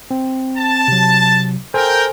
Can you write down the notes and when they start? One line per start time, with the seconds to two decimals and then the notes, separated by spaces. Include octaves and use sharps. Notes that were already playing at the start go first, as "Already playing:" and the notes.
0.11 C4
0.58 A5
0.88 C3 F#3
1.74 A4 A#4 C5 G5 G#5